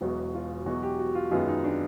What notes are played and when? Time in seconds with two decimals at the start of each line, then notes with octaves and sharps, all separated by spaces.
0.01 E1 E2 B2 F#3 F#4
0.34 F4
0.66 E2 B2 F#3 F#4
0.83 G4
0.99 F#4
1.15 F4
1.31 F#2 D#3 G#3 B3 F4
1.48 D#4
1.64 D4